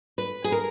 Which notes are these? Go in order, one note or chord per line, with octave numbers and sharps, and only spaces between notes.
B4
G#4
A#4